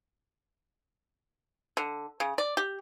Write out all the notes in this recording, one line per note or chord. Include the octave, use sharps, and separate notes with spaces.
D3
C#3
D5
G4